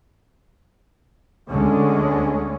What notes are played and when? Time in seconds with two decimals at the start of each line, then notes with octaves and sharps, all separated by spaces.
1.50 D2 D3 G#3 C#4